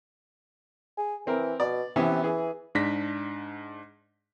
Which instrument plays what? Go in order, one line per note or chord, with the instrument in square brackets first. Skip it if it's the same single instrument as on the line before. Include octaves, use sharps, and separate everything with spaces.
[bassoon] G#4
[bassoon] E3 [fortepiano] C4 A#4
[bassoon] B2 [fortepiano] D5
[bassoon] C3 [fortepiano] E3 B3 C#4
[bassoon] E3 [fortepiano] G#4
[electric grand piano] G#2 D4 A#6 B6